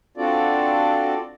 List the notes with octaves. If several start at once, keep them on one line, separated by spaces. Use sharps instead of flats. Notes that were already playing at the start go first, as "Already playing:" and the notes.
C4 D4 F4 F#4 A4 D5